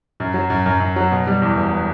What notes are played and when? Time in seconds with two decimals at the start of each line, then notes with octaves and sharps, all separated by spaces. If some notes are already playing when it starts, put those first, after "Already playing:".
0.20 F#2
0.34 F#3
0.50 F#2
0.66 F#2
0.80 F#2
0.96 F#3
1.11 B2
1.27 G3
1.42 E2
1.57 E1